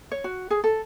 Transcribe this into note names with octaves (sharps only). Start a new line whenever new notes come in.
C#5
F#4
G#4
A4